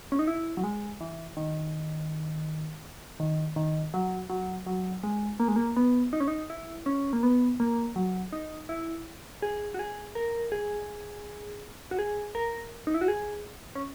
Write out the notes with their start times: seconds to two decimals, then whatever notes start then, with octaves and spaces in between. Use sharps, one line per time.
0.12 C#4
0.19 D#4
0.27 E4
0.57 F#3
0.64 G#3
1.01 E3
1.37 D#3
3.20 D#3
3.56 D#3
3.94 F#3
4.30 F#3
4.67 F#3
5.03 G#3
5.40 A#3
5.48 G#3
5.56 A#3
5.77 B3
6.13 D#4
6.20 C#4
6.28 D#4
6.50 E4
6.86 C#4
7.13 A#3
7.23 B3
7.60 A#3
7.96 F#3
8.33 D#4
8.69 E4
9.42 G#4
9.74 F#4
9.79 G#4
10.15 A#4
10.52 G#4
11.91 F#4
11.99 G#4
12.35 A#4
12.87 D#4
12.94 E4
13.01 F#4
13.08 G#4
13.75 C#4